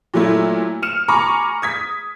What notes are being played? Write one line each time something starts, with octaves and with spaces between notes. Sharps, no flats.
A#2 F#3 A3 E4
F6 C#7 E7
G#5 A#5 B5 C#6 D6 C#7
D#6 G#6 B6